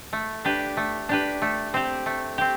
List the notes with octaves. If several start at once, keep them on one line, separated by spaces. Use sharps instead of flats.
A3
D4 G4 B4
A3
D4 G4 B4
A3
C4 G4
A3
C4 G4